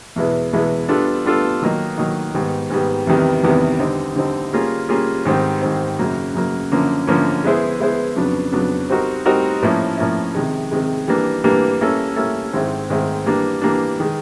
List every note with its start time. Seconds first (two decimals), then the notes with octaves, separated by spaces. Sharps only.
0.16 E2 B2 G#3 B3 E4
0.52 E2 B2 G#3 B3 E4
0.89 G3 B3 D4 F4 A4
1.25 G3 B3 D4 F4 A4
1.62 D#3 F#3 A#3 D#4
1.98 D#3 F#3 A#3 D#4
2.34 G#2 D#3 G3 B3
2.70 G#2 D#3 G3 B3
3.07 E2 C3 D#3 G3 B3
3.43 E2 C3 D#3 G3 B3
3.80 D3 G3 C4 D#4
4.16 D3 G3 C4 D#4
4.53 G3 A#3 C#4 F4 G#4
4.89 G3 A#3 C#4 F4 G#4
5.25 G#2 D#3 G3 C4
5.62 G#2 D#3 G3 C4
5.99 F#2 C#3 F#3 A#3
6.34 F#2 C#3 F#3 A#3
6.72 F#2 D3 F3 A#3 C#4
7.07 F#2 D3 F3 A#3 C#4
7.44 G#3 B3 E4 G#4 C5
7.80 G#3 B3 E4 G#4 C5
8.16 F2 C#3 F#3 B3 D4
8.52 F2 C#3 F#3 B3 D4
8.89 G3 C4 D#4 F#4 A#4
9.26 G3 C4 D#4 F#4 A#4
9.63 A2 F3 A#3 C#4 E4
9.98 A2 F3 A#3 C#4 E4
10.35 C3 D#3 G#3
10.71 C3 D#3 G#3
11.08 E3 G3 A#3 D4
11.44 E3 G3 A#3 D4
11.80 G3 A#3 C#4 E4 A4
12.16 G3 A#3 C#4 E4 A4
12.53 G#2 D#3 G#3 C4 E4
12.90 G#2 D#3 G#3 C4 E4
13.26 E3 G3 A#3 D4
13.62 E3 G3 A#3 D4
14.00 D#3 G#3